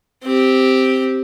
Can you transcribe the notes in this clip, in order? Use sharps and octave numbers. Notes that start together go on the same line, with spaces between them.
C4 G4